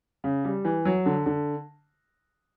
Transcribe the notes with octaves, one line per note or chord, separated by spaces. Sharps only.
C#3
G3
E3
F#3
D3
D3